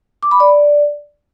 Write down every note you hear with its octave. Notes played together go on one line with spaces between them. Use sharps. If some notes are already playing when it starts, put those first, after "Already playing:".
D6
B5
D5